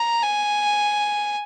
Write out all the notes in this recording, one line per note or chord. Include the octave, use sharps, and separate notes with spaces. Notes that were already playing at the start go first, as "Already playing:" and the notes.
Already playing: A#5
G#5